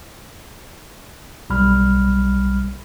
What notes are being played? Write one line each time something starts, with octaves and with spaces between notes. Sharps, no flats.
B1 G3 B5 F6